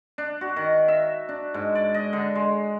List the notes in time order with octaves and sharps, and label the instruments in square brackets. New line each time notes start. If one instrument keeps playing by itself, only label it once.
[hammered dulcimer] D4
F#4
D#3
E5
D4
G#2
D5
D#5
D3
G#3